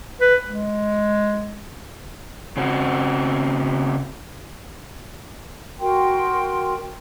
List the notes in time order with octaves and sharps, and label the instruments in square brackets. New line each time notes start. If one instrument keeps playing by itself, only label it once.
[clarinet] B4
G#3
[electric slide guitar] C#3 C4 F#4
[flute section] F#4 A#4 G5 C6